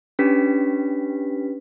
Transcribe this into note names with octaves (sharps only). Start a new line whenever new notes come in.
C#4 D4 G4 B4 B6